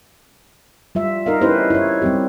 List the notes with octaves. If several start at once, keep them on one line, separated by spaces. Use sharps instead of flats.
G3 F4 E5
D#4 A#4 D#5 F5
C#4 D#4 E4 G4 B4 C5
E4 C#5
G3 C4 G4